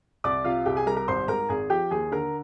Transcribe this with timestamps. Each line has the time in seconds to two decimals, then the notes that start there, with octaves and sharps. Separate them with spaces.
0.24 C2 D5 D6
0.44 C3 F4 F5
0.66 C2 G4 G5
0.76 G#4 G#5
0.86 G3 A#4 A#5
0.97 A#4 A#5
1.08 G#1 C5 C6
1.28 G#2 A#4 A#5
1.49 G#1 G#4 G#5
1.70 F3 G4 G5
1.90 D#2 G#4 G#5
2.11 D3 A#4 A#5